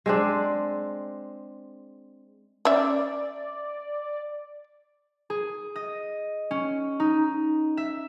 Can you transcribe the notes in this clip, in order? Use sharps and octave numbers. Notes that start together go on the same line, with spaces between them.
G#3 C4 D4
C#4 D5 E5
G#4
D#5
C#4
D#4
E5